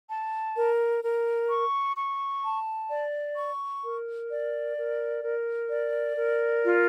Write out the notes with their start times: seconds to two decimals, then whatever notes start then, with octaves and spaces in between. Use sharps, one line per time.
0.10 A5
0.56 A#4
1.03 A#4
1.50 C#6
1.97 C#6
2.43 A5
2.91 D5
3.37 C#6
3.84 A#4
4.30 D5
4.76 A#4
5.24 A#4
5.70 D5
6.17 A#4
6.64 F4